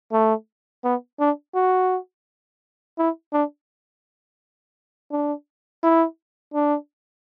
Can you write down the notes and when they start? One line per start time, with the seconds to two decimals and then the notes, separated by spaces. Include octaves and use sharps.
0.12 A3
0.84 B3
1.20 D4
1.55 F#4
2.98 E4
3.33 D4
5.11 D4
5.83 E4
6.54 D4